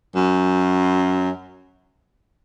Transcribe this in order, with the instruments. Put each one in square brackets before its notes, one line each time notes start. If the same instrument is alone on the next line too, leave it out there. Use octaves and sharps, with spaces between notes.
[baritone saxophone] F#2